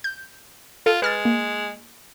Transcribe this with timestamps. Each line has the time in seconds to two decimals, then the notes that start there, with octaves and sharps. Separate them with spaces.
0.04 G6
0.86 F4 A4
1.02 G#3 B4 F6 A6
1.25 A#3